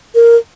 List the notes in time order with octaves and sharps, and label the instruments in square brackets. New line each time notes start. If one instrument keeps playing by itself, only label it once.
[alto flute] A#4